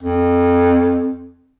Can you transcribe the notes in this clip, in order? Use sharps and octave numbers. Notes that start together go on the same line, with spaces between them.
F2